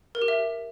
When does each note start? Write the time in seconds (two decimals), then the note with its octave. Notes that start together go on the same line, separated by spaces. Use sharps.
0.15 A#4
0.22 G4
0.28 E5